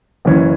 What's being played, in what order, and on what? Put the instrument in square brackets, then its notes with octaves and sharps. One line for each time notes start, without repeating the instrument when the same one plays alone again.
[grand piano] F#1 F#2 E3 C#4